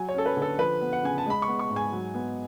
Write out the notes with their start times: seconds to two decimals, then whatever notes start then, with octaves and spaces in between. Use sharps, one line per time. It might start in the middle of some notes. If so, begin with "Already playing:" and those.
Already playing: F#3 G#5
0.09 C#5
0.15 C#4 A4
0.26 B4
0.37 D3
0.42 A4
0.58 F3 B4
0.81 B3
0.93 F#5
1.03 C#3 G#5
1.18 A5
1.26 G#3 B5
1.42 C#6
1.48 B3
1.59 C#6
1.70 G#2
1.76 G#5
1.92 F#3
2.15 B3